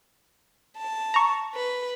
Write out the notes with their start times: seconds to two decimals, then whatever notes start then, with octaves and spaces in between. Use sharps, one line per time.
0.78 A5
1.14 A#5 C#6
1.55 B4